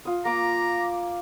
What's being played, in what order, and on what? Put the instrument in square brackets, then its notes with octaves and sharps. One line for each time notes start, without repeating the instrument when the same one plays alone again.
[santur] F4 D#6
[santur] A#3 D6 [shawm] A#5